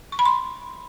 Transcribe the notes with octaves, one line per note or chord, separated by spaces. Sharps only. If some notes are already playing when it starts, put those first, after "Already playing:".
C#6
B5
C6